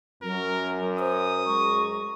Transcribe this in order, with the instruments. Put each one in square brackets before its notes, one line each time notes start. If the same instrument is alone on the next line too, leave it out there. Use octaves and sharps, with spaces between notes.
[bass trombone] F#2 [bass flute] F#3 [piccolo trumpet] A#4
[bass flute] C5 [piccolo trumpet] D#6
[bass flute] G#3 [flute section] A#5 C#6